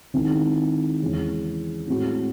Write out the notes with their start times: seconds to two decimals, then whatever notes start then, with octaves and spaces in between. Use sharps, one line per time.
0.14 D#3 G#3 C4 E4
1.01 E2 C#3 G#3 C#4
1.88 A2 G#3 C4 F#4